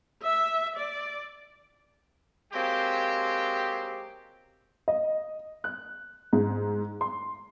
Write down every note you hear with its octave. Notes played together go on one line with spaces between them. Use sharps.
E5
D5
F#3 G#3 A#3 C4 G4
D#5
F#6
G#2
C6